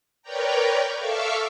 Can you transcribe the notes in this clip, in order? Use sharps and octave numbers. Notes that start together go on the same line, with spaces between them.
A#4 B4 C#5 D5 G5 A#5
A4 E5 F5 C#6 D6 E6